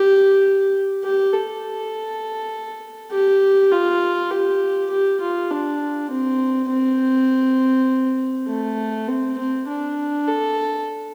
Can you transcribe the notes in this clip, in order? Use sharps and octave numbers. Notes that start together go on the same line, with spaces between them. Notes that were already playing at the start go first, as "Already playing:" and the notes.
Already playing: G4
G4
A4
G4
F4
G4
G4
F4
D4
C4
C4
A3
C4
C4
D4
A4